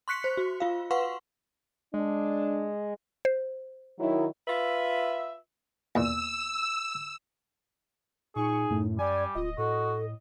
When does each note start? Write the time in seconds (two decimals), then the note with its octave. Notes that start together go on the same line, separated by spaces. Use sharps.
0.08 C6 C#6 F#6 B6 C#7
0.24 C5
0.37 F#4
0.60 F4 F5
0.91 B4 F5 F#5 C6 C#6
1.94 G#3 D4
3.25 C5
3.98 D#3 F#3 E4
4.47 F4 B4 E5
5.95 E2 A#2 E6
8.36 A#2 D#4 G#4 C#6
8.70 F#2 A2
8.99 G3 D5 G#5
9.35 D1 F4 D#5
9.58 A2 F#4 A4